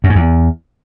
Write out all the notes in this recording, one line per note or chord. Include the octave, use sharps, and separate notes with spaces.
F#2
G#2
E2